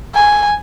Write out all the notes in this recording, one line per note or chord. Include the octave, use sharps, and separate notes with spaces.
G#5